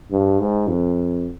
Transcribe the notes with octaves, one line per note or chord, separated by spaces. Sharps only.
G2
G#2
F2